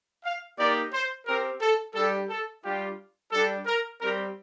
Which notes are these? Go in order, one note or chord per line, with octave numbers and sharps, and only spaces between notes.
F5
A#3 D#4 G4 D5
C5
C4 G4 A#4
A4
G3 D4 G4 A4
A4
G3 D4 F4 G4
G3 D4 G4 A4
A#4
G3 C4 G4 A#4